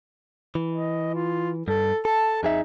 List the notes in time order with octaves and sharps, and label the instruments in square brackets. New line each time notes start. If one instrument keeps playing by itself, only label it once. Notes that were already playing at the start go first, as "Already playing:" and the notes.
[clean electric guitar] E3
[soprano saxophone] D#5
F4
[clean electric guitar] G2 [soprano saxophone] A4
[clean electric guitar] A4 [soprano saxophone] A5
[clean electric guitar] F2 G#4 E5 [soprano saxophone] D#4